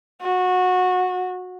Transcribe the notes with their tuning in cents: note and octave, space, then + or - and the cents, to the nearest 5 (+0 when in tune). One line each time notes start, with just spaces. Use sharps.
F#4 -20